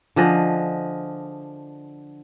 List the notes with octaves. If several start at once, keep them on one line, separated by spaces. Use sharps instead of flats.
D3 F3 G#4 D#5